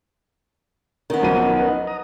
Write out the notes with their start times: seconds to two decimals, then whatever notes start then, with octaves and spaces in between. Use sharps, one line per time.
1.10 D#3 B3 C#4 D#4 A#4
1.23 B1 F3 D#7
1.60 B4 D#5
1.87 A#5 D#6